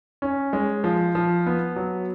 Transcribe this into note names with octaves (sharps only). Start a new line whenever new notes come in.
C#4
G#3
F3
F3
B3
F#3